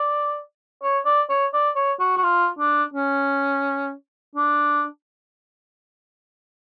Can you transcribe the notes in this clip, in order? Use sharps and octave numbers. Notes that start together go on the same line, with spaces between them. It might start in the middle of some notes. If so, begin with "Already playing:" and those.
Already playing: D5
C#5
D5
C#5
D5
C#5
F#4
F#4
F4
D4
C#4
D4